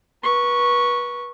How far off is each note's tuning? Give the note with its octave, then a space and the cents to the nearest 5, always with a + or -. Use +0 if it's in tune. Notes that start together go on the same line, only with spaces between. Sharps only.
B4 -30 C#6 +0